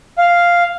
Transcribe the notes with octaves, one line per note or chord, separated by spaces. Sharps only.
F5